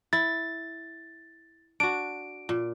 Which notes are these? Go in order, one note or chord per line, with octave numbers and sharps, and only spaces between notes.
E4 A6
D4 F#4 D7
A#2